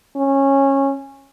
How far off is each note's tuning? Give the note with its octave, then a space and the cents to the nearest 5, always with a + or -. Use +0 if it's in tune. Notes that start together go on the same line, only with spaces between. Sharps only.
C#4 -15